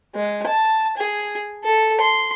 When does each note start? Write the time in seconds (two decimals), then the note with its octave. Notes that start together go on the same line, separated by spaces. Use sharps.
0.15 G#3
0.47 A5
0.97 G#4
1.64 A4
2.00 C6